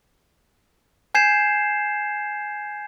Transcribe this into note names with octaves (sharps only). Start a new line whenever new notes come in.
G#5 G6 G#6 C7 E7